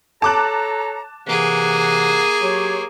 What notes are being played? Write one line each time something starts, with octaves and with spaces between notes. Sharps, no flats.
A4 C#5 A5 A#5 D6 F#6
C3 E3 A#3 G#4 F#5
F#3 G4 C#5